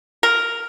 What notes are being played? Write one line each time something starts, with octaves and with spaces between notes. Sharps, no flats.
A#4